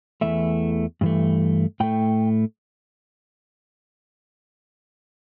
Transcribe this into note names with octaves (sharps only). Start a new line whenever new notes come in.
E2 E3 A3 E5
G2 E3 A3
A2 A3 G5